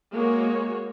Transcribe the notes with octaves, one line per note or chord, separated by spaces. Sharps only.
G#3 A#3 F#4 C#5